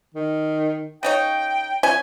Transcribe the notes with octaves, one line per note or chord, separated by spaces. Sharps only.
D#3
C#3 D#4 C#5 G5
F3 C#4 G#5